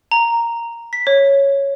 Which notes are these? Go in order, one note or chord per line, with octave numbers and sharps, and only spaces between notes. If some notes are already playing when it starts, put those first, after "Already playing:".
A#5
B6
C#5